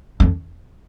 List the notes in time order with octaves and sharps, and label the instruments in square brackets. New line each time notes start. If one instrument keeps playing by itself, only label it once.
[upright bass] F2